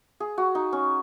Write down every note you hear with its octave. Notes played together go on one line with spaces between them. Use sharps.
G#4
F#4
D#4
C#4